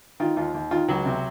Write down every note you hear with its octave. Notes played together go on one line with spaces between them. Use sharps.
D#3 F4
D#2 F4
D#2
D#3 F4
C#2 F#3 F#4
C3